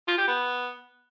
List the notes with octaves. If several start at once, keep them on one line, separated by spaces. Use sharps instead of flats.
F4
G4
B3